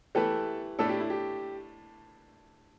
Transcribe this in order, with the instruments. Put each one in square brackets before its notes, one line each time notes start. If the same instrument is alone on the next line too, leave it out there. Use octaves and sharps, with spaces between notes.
[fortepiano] E3 A3 G4 B4 [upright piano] A4
[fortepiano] A2 A3 D4 [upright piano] A4
[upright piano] G4
E4
G4